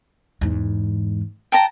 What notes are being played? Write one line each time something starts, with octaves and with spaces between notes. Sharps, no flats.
E2 G#2
G5 A5 A#5